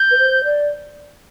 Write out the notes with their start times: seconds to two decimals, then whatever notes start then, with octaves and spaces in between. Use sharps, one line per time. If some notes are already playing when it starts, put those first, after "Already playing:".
Already playing: G6
0.11 B4
0.18 C5
0.44 D5